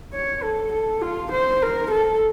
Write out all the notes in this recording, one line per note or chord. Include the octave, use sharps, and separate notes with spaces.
C#5
A4
A4
F4
C5
A#4
A4